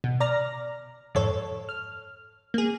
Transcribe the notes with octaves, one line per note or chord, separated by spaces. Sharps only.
B2
D5 A#5 F6 A#6
F2 G#2 A4 C#5
F6
A#3 G#4